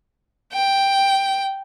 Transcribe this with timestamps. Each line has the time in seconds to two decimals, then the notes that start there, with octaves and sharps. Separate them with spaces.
0.52 G5